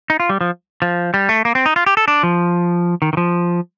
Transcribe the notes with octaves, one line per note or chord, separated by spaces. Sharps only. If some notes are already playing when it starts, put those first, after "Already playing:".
D#4
F4
G3
F3
F3
G3
A3
A#3
C4
D#4
F4
G4
A4
D4
F3
D#3
D#3
F3